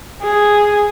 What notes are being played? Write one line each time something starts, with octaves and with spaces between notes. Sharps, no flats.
G#4